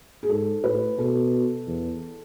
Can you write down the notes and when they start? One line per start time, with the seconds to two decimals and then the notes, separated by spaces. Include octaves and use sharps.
0.23 G#4
0.29 G#2 A4
0.64 A2 B4
0.98 B2 A4
1.67 E2